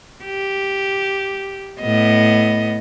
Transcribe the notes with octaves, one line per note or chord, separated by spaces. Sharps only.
G4
A2 B3 D#5